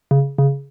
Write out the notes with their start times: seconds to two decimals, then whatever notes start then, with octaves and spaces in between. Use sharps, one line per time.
0.11 C#3
0.38 C#3